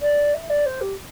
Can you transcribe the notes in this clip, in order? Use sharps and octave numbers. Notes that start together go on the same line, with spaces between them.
D5
E5
D5
C5
G4